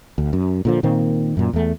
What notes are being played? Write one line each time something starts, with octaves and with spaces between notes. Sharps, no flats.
D2
F#2
A#2 D3 F3
A#2 D#3 A#3 C4
F#2 A#2
E2 A3